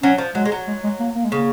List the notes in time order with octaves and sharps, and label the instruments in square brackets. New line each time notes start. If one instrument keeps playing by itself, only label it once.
[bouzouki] F#3 [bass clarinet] C#4
[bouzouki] F3
[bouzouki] F#3 [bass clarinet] G#3
[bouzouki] G#3
F#3
[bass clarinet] G#3
G#3
A#3
A#3
G#3
[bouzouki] C#3 [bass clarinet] A#3